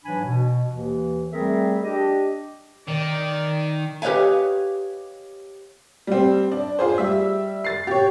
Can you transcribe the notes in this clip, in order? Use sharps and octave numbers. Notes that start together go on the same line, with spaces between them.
G#2 E3 F#3 D4 G#5 B5
B2
D#2 E3
G3 A3 C4 G#4 A#4 E5
D4 G4 D#5
D#3 D5
G4 B4 C#5 D#5 F5 G#5
G3 C4
D4
F4 G#4 C5
G3 E5
A6 C7
G4 C#5